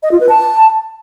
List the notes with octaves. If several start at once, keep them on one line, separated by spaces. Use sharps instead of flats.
D#5
F4
B4
A5